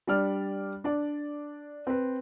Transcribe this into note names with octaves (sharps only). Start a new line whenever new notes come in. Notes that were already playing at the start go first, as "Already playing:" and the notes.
G3 D4 D5 F6
D4 D5
C4 B4